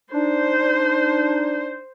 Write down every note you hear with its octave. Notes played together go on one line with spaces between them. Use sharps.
D4 D#4 C5